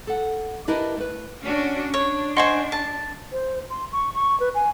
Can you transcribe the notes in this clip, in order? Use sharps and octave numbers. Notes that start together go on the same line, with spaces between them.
A4 F#5
D4 E4 G4 A#4 B4 D#5
A3 B4
C#4 D4 F#4
D4 C#5
C5 D#5 F#5 G#5 C6 C#6
A5
C5
C6
C#6
C#6
B4
G#5